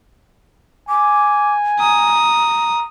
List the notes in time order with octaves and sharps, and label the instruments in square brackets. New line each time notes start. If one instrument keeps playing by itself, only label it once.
[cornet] G#5 [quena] D6
[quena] A#5 [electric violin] D#6